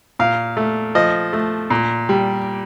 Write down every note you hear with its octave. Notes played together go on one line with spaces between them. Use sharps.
A#2 F5
A3
F3 D#5
A3
A#2
G3